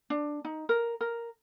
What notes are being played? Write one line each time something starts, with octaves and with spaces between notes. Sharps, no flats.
D4
D#4
A#4
A#4